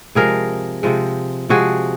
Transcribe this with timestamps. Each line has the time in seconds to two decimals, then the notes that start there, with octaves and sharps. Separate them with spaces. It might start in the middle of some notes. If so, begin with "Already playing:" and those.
0.15 C3 F3 G#3 G#4 A#4
0.83 C3 F3 G#3
1.49 C3 F3 G#3 F#4 G#4